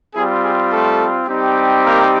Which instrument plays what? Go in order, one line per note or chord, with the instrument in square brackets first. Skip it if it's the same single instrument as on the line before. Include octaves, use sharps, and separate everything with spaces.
[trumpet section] G3 C4 F4 G#4
G#4
A3 A4
G3 C4 D#4 G4
A#3 A#4